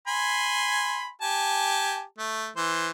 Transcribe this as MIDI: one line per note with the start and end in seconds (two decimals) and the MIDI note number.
0.08 1.09 80
0.08 1.09 83
0.08 1.09 84
1.21 2.03 67
1.21 2.03 80
1.21 2.03 81
2.18 2.49 57
2.56 2.90 52
2.56 2.90 72